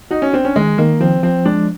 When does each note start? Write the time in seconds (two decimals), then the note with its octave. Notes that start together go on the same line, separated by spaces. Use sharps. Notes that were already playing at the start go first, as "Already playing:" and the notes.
0.11 D#4 F#4
0.22 C#4
0.33 C4 D4
0.45 C#4
0.56 D#3 G#3
0.78 D#3 A#3
1.00 F3 C4
1.23 F3 C4
1.45 G#3 D4